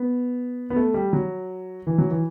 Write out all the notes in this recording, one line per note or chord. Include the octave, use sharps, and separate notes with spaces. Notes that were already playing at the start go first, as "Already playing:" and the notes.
Already playing: B3
B3
A3
G3
F#3
E3
F#3
E3